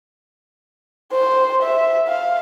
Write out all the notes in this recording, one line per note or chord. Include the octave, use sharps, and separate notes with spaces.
C5
E5
F5